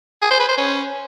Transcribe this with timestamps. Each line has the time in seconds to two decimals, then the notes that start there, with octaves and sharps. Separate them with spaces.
0.22 G#4
0.31 C5
0.40 B4
0.49 C5
0.58 C#4